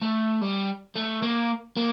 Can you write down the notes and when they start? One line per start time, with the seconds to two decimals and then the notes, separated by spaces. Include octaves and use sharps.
0.02 A3
0.41 G3
0.96 A3
1.22 A#3
1.77 A#3